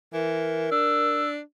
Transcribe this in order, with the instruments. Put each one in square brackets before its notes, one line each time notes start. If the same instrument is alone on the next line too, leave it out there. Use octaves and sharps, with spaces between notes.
[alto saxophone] E3 [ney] A#4
[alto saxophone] D4 [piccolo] E6